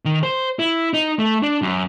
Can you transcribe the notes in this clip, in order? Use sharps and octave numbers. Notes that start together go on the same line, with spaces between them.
D#3
C5
E4
D#4
A3
D4
F#2